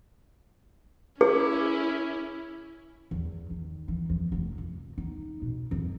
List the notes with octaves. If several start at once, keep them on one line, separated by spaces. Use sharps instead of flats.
C#4 E4 G#4
E2
D#3
E3
F2
F1
F1
D#4
B2
F2